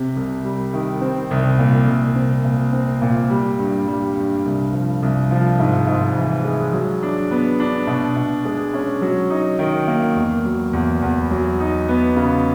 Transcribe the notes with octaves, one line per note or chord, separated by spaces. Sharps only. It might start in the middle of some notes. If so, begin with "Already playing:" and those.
Already playing: C3
C2
G3
D#3
C4
C2
A#2
C2
C4
A#2
C4
A#2
G3
G2
G3
G2
C2
F3
C2
F3
G#2
G#2
E3
G#3
F#3
D4
B3
D4
B2
B2
G#3
C#4
F#3
D#4
D#3
A#3
E2
F#3
E2
E2
F#3
D#4
B3
C#3